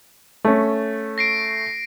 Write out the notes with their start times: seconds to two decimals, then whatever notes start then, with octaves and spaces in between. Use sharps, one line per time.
0.45 A3 C#4
1.18 A#6 C7 D7